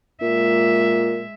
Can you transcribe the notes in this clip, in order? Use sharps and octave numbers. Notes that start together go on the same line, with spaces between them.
A#2 G#3 E5